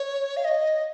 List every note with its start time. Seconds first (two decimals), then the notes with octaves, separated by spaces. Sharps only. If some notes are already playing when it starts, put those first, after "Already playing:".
Already playing: C#5
0.37 F5
0.44 D#5